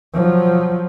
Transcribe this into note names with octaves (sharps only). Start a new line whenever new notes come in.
F3 F#3